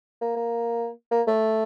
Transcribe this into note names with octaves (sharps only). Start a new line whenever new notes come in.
A#3
A#3
A#3
A3